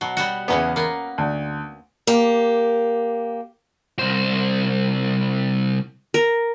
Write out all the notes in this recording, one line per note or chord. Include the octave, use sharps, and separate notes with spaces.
B2 F#3
G3 B3 F#4
E2 C#3 E3 B3 C#4
A#3 B3 A#4
D2
A#3 G4
C2 C5
A#4